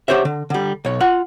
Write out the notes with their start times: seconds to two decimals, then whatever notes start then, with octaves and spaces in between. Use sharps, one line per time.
0.08 D3 G4 C5 C#5 E5
0.25 D3
0.50 D3 G3
0.85 B1 C#5
1.00 F4 F#5